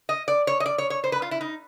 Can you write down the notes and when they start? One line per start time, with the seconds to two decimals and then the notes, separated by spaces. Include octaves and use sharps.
0.09 D#5
0.28 D5
0.47 C#5
0.60 D#5
0.66 D5
0.78 C#5
0.90 C#5
1.04 C5
1.12 B4
1.22 F4
1.31 E4
1.41 D#4